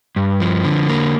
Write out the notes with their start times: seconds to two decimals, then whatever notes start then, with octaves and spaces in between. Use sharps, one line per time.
0.16 G2
0.40 F3
0.65 D3
0.89 A#3